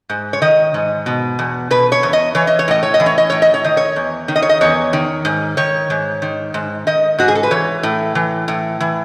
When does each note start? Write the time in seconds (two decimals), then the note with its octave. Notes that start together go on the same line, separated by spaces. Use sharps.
0.10 G#2
0.33 C#5
0.42 D#3 D#5
0.74 G#2
1.06 B2
1.39 E2
1.71 B2 B4
1.92 C#5
2.03 E2
2.13 D#5
2.35 E3 C#5
2.47 D#5
2.59 C#5
2.68 A2 D#5
2.83 C#5
2.94 D#5
3.00 E3
3.06 C#5
3.18 D#5
3.30 A2 C#5
3.42 D#5
3.54 C#5
3.64 D#3 D#5
3.77 C#5
3.96 E2
4.28 D#3
4.36 D#5
4.42 C#5
4.49 D#5
4.61 E2 C#5
4.93 D#3
5.25 G#2
5.57 D#3 C#5
5.90 G#2
6.22 D#3
6.54 G#2
6.87 D#3 D#5
7.18 G#2 F#4
7.28 G#4
7.35 A4
7.43 B4
7.51 E3 C#5
7.83 A2
8.15 E3
8.48 A2
8.80 E3